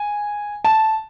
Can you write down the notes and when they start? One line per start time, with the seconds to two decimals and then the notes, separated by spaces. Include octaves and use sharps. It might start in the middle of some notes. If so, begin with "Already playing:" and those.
Already playing: G#5
0.65 A5